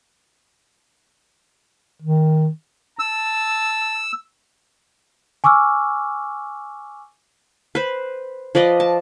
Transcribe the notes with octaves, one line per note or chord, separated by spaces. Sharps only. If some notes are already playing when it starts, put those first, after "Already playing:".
D#3
A5 E6
G#5 C#6 D6 E6 F6
B4 C5
F3 B4 D5 D#5
A5